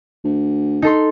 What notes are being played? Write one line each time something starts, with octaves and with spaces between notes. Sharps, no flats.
D2
D#4 A4 C6